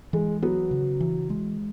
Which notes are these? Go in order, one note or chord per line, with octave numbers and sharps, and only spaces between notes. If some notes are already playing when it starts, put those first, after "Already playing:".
E3 G#3
F#3 B3
C#3
E3
G#3